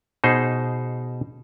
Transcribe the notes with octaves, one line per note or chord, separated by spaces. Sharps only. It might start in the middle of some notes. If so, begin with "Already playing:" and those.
B2 D#4 G#4 C5